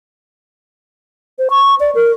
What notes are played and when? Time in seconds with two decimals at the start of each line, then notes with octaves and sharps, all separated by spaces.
1.39 C5
1.50 C#6
1.80 D5
1.95 A#4